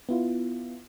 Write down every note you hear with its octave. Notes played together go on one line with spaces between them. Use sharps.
B3 E4 F4